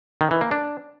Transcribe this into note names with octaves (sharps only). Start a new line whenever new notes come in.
D#3
E3
A#3
D4